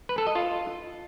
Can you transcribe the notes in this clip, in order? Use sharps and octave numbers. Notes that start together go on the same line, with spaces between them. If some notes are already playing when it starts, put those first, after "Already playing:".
B4
A4
D#5
F4